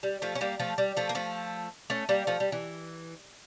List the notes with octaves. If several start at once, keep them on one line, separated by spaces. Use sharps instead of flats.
G3
F3 A3
C#4
G3 A#3
F3 A3
G3
F3 A3
A#3
F3 A3
A3 C#4
G3 A#3
F3 A3
G3
E3